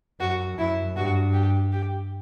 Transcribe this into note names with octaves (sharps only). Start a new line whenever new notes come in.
F#2 F#4
F#2 E4
G2 F#4
G4
G4